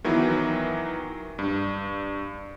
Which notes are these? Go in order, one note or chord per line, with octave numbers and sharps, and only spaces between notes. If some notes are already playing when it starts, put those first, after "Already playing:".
D#3 E3 F#3 B3
G2